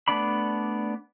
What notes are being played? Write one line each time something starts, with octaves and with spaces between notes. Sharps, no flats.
A3 B3 D4 D5 B5